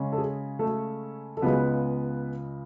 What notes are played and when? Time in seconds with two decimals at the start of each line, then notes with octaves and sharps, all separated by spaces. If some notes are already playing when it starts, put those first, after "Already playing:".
Already playing: C#3 G#3 C#4
0.12 A4
0.18 G#4
0.59 A3 A4
1.37 A4
1.42 C#2 C#3 G#3 B3 B4